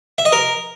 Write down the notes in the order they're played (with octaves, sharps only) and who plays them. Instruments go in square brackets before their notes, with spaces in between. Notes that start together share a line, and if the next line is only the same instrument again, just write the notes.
[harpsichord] E5
D#5
A#4